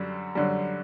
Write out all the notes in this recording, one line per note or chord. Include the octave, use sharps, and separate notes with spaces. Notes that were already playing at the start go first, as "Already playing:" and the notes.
Already playing: F#2 D3 G3
F#2 D3 G3